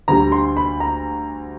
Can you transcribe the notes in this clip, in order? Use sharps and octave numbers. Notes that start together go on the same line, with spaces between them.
D2 D3 G3 A#5
C6
B5
A#5